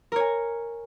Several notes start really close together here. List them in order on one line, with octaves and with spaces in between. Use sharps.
A#4 C#5 G#5